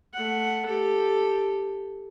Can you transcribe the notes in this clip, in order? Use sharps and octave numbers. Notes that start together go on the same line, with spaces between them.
A3 F#5
G4 A4